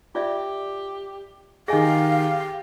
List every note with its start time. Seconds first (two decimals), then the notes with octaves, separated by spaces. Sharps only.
0.15 F4 G4 D5 E5
1.68 D#3 G4 G#4 D#5 F5 G#5 A#6